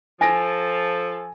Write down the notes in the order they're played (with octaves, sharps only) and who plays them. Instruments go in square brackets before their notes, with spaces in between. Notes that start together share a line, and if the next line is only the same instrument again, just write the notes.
[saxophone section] F3 A4 [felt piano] G#5 A#6 D7